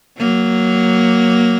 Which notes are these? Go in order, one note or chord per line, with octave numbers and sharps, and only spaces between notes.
F#3 A#3